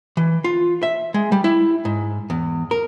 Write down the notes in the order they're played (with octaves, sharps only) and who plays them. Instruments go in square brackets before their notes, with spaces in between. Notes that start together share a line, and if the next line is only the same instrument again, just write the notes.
[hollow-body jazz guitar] E3
F4
E5
G#3
G3
E4
G#2
E2
A#4